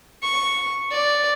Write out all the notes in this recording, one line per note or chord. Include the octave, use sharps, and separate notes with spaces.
C#6
D5